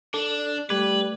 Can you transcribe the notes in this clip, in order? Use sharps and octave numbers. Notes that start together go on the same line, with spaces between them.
D4 A4
G3 A3 B4 D6 G#6